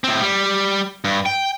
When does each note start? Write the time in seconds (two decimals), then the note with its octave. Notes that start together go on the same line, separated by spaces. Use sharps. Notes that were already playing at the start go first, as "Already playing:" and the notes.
0.04 A2 C4
0.21 G3
1.04 G2
1.26 G5